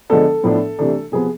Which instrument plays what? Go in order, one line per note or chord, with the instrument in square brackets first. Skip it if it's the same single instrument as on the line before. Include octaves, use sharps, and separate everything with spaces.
[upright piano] D3 F3 G#3 B3 D4 A4
A2 F3 B3 D4
C3 E3 A3 D4
C3 F3 B3 G#4